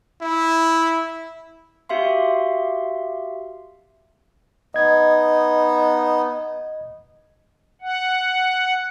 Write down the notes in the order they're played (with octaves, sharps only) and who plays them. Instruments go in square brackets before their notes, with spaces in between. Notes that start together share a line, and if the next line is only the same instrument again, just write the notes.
[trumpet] E4
[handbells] F#4 G4 E5 F5 C6
[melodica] B3 D#4 [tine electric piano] D#5 G#6
[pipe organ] F#5